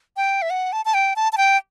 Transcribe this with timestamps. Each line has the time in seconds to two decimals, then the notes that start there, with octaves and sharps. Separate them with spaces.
0.17 G5
0.42 E5
0.50 F#5
0.73 A5
0.85 A5
0.94 G5
1.16 A5
1.33 A5
1.38 G5